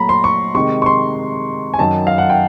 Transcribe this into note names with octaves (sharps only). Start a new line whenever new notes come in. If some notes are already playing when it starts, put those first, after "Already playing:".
Already playing: A#2 F#3 A3 A#5 B5
C6
C#6
C3 D#3 G#3 C#6
C#6
C6
G#5
F#2 D#3 F#3 A5
F5
F#5
G5